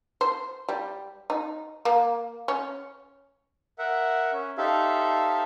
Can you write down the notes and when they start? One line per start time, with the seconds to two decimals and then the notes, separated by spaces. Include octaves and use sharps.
0.21 C5
0.69 G3
1.30 D#4
1.85 A#3
2.48 C#4
3.78 A#4 E5 F#5
4.32 C#4
4.58 D#4 G4 A4 C5 E5 F5